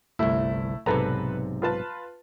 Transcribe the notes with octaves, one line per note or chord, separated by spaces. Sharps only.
G1 C2 A3 E4
B1 G#2 C3 A4 B4 A#5
F4 B4 A5